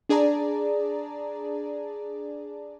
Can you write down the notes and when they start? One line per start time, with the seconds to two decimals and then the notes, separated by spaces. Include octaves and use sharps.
0.09 D4 G#4 D5 A5 A#5